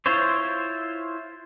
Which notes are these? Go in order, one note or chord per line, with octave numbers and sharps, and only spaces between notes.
E4 F4 C5 C#5